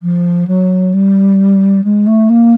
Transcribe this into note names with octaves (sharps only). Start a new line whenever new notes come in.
F3
F#3
G3
G#3
A3
A#3